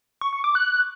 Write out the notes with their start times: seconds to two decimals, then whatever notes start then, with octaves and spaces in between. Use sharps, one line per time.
0.21 C#6
0.33 C#6
0.44 D6
0.55 F#6